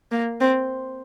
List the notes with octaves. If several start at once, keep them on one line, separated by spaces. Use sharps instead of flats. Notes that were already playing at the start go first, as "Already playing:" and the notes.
A#3
C4